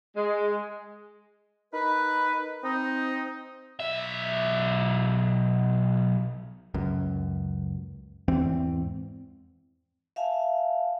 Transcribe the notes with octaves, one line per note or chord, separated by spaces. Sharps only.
G#3
D#4 A#4 B4
C4 D#4
B1 E5
C#2 F#2
E2 G#2 E3 C4
E5 F5 G#5 A5